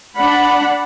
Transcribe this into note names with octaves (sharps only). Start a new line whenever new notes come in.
D4 D5 F#5 B5